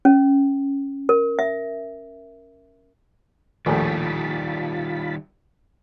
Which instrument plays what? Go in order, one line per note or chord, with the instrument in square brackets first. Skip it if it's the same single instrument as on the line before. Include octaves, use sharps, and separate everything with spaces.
[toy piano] C#4
A#4
E5
[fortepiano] A#1 D#2 A2 [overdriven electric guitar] D#3 G3 [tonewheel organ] F4 A5 B5